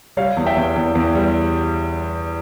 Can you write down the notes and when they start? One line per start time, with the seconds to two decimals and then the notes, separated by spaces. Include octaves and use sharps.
0.17 G3 C#5 F5
0.37 E2
0.46 E5 G5
0.56 E2
0.76 E2
0.95 E2
1.15 G3